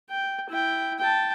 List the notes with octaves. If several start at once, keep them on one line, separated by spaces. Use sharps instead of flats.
G5
E4 G5
G5 A5